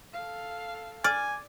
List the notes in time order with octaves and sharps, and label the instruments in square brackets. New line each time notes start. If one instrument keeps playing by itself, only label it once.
[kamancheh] A4 F5
[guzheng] D5 [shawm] G#5 [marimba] F6